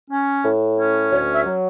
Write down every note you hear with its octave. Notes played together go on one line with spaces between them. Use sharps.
C#4
A2
C#4
D2 C#5
E5
F#3